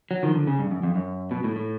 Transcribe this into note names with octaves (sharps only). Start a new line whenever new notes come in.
F#3
D#3 F3
D3
C#3
G2
F#2
F2
F#2
B2
A2
A2